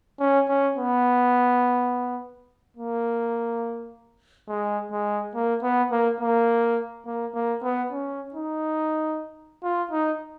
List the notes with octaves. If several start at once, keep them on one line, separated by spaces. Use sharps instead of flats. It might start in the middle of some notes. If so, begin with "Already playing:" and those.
C#4
C#4
B3
A#3
G#3
G#3
A#3
B3
A#3
A#3
A#3
A#3
B3
C#4
D#4
F4
D#4